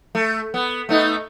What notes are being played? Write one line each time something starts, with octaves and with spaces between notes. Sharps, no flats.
A3
B3
A3 B3 D#4